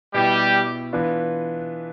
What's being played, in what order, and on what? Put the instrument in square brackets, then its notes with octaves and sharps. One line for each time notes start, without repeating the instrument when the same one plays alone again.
[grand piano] B2 B3 E4 [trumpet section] G3 G4
[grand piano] E3 B3 D4 F4 B4